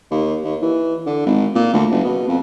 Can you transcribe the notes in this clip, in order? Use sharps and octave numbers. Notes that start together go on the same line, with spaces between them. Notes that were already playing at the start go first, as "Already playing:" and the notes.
D#2
D#2
E3
D3
G#1
A#2
D2
F#1
B2
F2